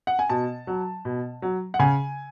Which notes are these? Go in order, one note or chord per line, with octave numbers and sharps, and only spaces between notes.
F#5
G#5
B2 A5
F#3
B2
F#3
F#5
C#3 G#5